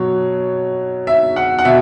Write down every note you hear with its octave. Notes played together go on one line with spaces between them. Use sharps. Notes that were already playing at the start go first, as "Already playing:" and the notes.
Already playing: B2 F#3 C#5
E5
F#5
F#5
B2 E5